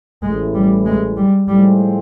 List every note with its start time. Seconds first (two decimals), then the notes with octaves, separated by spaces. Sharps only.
0.22 A1 A2 E3 G#3
0.54 G3
0.85 G#3
1.17 G3
1.47 A2 F3 G3 G#3 C4